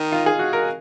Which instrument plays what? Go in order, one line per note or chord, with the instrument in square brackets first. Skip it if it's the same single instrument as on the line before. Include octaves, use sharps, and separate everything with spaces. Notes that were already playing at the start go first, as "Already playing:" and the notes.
Already playing: [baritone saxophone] D#3 [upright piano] D#4
[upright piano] F4
G#4
F#4
A#4